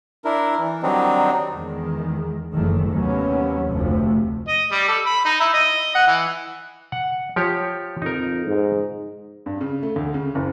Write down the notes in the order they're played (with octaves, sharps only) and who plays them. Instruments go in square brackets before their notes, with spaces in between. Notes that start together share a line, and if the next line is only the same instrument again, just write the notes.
[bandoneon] D4 E4 A#4
E3
D#3 F#3 G3 C4 D4 D#4
[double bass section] E2 D#3 G#3
F#1 D#3 E3 A3
D#2 C3 D#3 F#3 B3 C#4
F1 D2 C3 F3 A3
[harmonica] D#5
G3
A4
B5
D#4
E4
D#5
F#5
E3
[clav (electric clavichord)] F#5
F3 G4 C#5
[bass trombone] F2 [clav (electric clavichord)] D#4 A#4
[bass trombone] G#2
[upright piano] G2
C#3
A3
D2
C#3
F#1